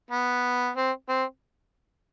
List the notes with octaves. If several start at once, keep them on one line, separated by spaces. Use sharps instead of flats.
B3
C4
C4